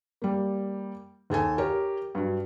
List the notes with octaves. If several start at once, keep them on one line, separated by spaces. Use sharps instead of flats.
G3 A#3
D#2 G#4 A4 G#5
G4 A#4 C#5
G2 F#3